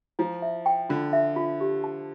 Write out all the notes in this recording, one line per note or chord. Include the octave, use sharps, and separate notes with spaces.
F3 E4
E5
G5
D3 F4
E5
F4
G4
A5